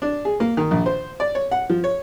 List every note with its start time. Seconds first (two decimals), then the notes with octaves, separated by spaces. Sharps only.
0.02 D4
0.25 G#4
0.40 A#3
0.57 D#3
0.71 A#1
0.86 C5
1.20 D5
1.35 C#5
1.51 F#5
1.70 F3
1.84 C#5